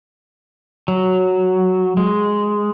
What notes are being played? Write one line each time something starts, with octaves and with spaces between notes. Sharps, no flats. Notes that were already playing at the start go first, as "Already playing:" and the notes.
F#3
G#3